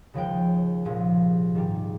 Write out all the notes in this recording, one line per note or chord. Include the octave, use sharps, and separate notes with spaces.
D#2 C#3 F3 G#3 G5
C2 A#2 F3 G#3
G#2 D#3 G3